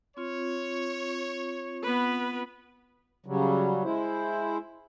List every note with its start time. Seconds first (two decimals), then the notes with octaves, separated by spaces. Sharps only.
0.17 C4 F4 C#5
1.82 B3 B4
3.26 C#3 F#3 G3
3.84 G#3 E4 C5